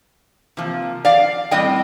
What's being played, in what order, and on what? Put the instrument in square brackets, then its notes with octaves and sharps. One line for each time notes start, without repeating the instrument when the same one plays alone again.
[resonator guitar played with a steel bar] C3 F3 A#3
D5 F5
A2 G3 C4 D#5 G5